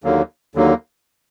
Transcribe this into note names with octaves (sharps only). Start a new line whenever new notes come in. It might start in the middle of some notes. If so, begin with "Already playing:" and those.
D#2 D3 F#3 A#3
D#2 D3 F#3 A#3